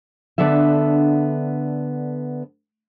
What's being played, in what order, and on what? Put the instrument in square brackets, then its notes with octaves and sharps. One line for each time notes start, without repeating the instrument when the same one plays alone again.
[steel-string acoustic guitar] D3 B3 D4 A4 E5